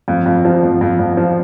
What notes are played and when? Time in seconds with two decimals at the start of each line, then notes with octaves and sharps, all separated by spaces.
0.08 F2
0.26 F2
0.45 F3
0.63 F2
0.81 F2
0.99 F2
1.17 F3